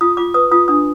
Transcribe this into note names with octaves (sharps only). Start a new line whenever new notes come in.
F4 D#6
F4 D6
B4 D#6
F4 D#6
D4 D#6